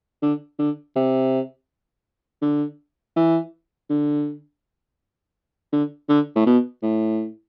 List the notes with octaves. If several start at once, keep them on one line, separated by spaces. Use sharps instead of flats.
D3
D3
C3
D3
E3
D3
D3
D3
A2
B2
A2